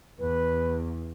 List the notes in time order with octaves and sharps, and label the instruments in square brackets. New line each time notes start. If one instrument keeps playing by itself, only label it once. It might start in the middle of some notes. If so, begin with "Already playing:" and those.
[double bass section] E2 [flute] B4